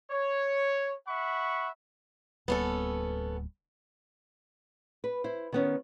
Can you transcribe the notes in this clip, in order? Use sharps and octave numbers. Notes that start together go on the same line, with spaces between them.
C#5
E5 F#5 B5 C#6
D1 G3 A#3 B3 C#4 A4
B4
E4 C5
D#3 B3 C#4